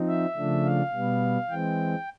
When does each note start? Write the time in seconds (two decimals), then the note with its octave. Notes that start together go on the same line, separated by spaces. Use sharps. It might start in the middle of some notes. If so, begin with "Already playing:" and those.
Already playing: F3 C4 D#4
0.08 E5
0.36 C#3 F3 A3 D4
0.65 F5
0.93 B2 G3 B3
1.49 E3 G#3 C4 G5